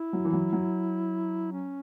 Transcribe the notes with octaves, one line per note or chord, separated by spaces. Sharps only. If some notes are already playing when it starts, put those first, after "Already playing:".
Already playing: E4
F#3
E3
F#3
F#3
C#4